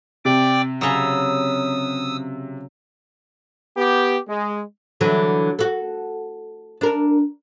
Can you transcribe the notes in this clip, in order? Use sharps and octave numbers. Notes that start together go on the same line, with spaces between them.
C3 D5 G5 D6
C#3 F#3 D#6 E6
B3 G4
G#3
D3 E3 F#3
F#4 A4
D4 A#4